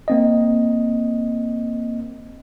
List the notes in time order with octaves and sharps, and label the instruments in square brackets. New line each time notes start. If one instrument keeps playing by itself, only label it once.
[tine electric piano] A#3 C4 D#5